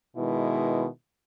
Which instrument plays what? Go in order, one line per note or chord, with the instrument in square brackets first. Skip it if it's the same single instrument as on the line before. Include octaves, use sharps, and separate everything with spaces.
[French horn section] B2 D#3 G#3 E4 B4